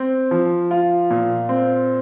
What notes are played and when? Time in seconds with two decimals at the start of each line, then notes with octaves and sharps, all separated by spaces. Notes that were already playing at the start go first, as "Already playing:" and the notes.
Already playing: C4
0.31 F3
0.71 F4
1.11 A#2
1.49 C4